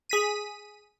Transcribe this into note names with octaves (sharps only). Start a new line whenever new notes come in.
G#4 B6 D#7